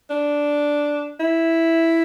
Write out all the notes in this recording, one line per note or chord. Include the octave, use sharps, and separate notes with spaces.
D4
E4